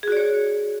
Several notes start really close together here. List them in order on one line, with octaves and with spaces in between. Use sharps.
G#4 F#4 D5 C#5